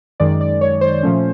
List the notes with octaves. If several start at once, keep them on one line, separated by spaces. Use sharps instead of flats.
F#2 D#3 G#3 D5
D5
C#5
C5
A#2 F3 A3 C#4